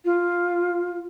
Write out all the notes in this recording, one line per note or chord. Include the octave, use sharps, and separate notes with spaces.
F4